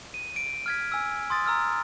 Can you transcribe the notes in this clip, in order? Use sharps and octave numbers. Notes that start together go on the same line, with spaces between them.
D#7
D7
F6 G#6 B6
G#5 E6
C6 D#6 A6
A#5 E6 F6